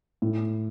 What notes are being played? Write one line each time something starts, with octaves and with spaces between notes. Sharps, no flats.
A2